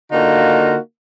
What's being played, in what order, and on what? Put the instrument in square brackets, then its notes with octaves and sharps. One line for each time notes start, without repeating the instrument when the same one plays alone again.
[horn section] D3 A#3 D#4 F4 F#4